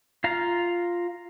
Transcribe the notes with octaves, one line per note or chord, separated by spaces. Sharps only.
F4 F5 A#5